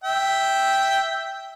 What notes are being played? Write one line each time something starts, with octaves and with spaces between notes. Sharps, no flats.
E5 G5